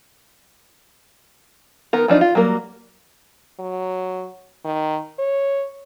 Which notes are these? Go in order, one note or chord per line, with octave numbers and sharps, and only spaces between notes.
D#3 B3 A#4
E3 F3 D4 D#4
F4
F#3 G3 A#3 A#4
F#3
D#3
C#5